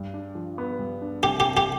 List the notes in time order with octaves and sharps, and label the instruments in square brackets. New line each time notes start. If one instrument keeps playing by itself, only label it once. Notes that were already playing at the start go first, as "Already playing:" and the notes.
Already playing: [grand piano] G2
D4
F3
B3
G2
D4
[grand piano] C3 [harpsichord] G4
[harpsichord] G4
[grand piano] C3
[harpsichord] G4